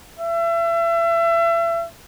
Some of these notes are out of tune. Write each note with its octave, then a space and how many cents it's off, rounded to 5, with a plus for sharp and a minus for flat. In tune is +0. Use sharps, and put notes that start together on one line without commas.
E5 +35